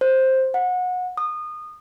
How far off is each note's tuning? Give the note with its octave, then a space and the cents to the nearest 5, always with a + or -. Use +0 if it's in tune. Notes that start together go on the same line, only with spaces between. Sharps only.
C5 +10
F#5 -25
D#6 -25